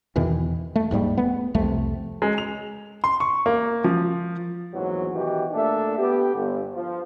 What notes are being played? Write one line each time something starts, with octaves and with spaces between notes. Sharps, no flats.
E2 B2 D#3 E3
A3
D#1 G#2 G3 A#3
A3 B3
C2 F2 C3 A3
G#3
F7
C6
C#6
A#3
F3
A#1 E2 G#2 E3 F#3
B2 D#3 E3 F#4 G4
A#2 A3 D4 A4 E5
B3 G4
G1
F3